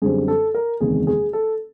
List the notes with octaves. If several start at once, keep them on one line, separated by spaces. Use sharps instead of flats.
F#2 D3 G3 C4 G#4
A4
A#4
F#1 E2 C3 D#3 G#3 G#4
G#4
A4